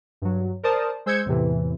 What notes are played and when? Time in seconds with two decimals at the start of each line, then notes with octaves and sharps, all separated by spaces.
0.22 G2 F#3
0.63 A#4 C5 D5 A5 D#6
1.06 G#3 C5 E6 G6 G#6 C#7
1.26 E2 A2 C3 E3